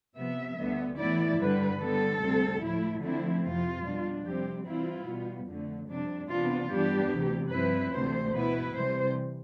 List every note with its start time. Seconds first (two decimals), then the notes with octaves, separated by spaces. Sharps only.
0.16 C3 F3 B3 E5
0.57 D2 D3 G3 B3
0.98 A2 E3 B3 E4 D5
1.39 G2 D3 G3 B4
1.80 D3 G3 B3 A4
2.21 D2 C3 G3 C4
2.61 A2 F3 A3 E4
3.02 D3 F3 A3 C4 E4
3.43 F2 C3 F3 F4
3.84 B2 G3 D4
4.25 F2 C3 G3 C4 G4
4.65 C3 E3 G3 C4 E4 F4
5.07 B2 G3 B3
5.47 F2 D3 A3
5.88 F2 C3 G3 D4
6.29 C3 E3 B3 D4 F4
6.70 G2 E3 G3 B3 D4 G4
7.11 D2 C3 E3
7.51 G2 F3 C4 E4 B4
7.92 D2 C3 E3 A3 C5
8.33 B2 B3 E4 B4
8.74 C3 E3 G3 C5